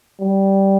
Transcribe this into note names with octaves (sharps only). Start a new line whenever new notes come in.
G3